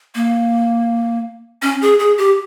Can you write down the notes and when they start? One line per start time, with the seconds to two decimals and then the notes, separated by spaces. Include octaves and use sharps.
0.15 A#3
1.62 C#4
1.82 G#4
1.99 G#4
2.18 G4